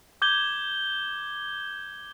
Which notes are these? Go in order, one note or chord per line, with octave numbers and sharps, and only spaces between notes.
D6 G6 G#6 G7